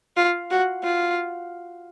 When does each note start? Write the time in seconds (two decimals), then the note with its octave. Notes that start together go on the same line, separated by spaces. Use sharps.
0.17 F4
0.51 F#4
0.84 F4